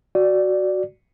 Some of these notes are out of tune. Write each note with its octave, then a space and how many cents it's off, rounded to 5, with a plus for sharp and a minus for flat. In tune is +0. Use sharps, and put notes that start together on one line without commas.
F#4 +5 D5 +0